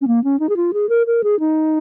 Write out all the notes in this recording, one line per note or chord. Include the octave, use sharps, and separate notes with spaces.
C#4
A#3
C#4
D#4
G#4
F4
G#4
A#4
A#4
G#4
D#4